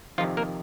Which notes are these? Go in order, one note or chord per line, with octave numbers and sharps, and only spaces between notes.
F2 C3 D#3 F3 F4
A#3 A#4